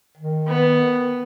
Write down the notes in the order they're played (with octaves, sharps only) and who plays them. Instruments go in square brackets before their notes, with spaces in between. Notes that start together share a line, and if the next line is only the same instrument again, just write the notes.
[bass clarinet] D#3
[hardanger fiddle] B3